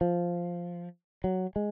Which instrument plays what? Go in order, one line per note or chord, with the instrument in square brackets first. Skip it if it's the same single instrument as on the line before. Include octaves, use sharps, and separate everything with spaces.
[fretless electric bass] F3
F#3
G#3